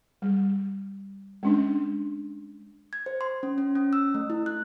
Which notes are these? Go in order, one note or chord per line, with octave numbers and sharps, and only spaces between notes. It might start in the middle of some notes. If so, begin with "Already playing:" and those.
G3
G#3 C#4 D4
G#6
C5
C6
C#4
C#4
C#4
E6
A3
E4
F#6